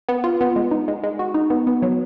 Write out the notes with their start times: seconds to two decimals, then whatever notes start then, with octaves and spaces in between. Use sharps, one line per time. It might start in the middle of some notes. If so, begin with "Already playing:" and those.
0.09 B3
0.24 F4
0.41 B3
0.56 G#3
0.71 D#4
0.88 G#3
1.04 G#3
1.19 F#4
1.34 D#4
1.50 B3
1.67 B3
1.82 F#3